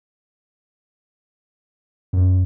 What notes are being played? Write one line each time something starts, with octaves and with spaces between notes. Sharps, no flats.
F#2